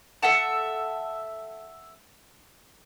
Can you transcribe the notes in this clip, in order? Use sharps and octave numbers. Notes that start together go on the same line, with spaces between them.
A4 E5 F#5 A5